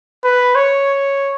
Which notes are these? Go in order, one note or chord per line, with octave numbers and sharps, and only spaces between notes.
B4
C#5